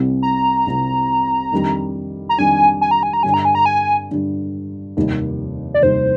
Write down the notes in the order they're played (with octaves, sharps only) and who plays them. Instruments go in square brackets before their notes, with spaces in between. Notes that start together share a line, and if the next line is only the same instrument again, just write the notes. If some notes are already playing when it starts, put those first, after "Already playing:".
Already playing: [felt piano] C2 C3 G3 C4
[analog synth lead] A#5
[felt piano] C2 C3 G3 C4
F2 D#3 G3 D4
[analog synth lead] A#5
[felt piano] F2 D#3 G3 D4 [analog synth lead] G#5
[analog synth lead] G#5
A#5
G#5
A#5
[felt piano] G2 D3 G3 [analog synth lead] G#5
[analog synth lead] A#5
G#5
A#5
G#5
[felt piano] G2 D3 G3
F1 D#2 D#3 G3
[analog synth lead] D5
[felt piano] F1 D#2 D#3 G3 [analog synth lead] C5